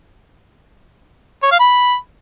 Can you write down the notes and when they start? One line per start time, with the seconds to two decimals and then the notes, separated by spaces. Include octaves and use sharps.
1.43 C#5
1.51 F5
1.60 B5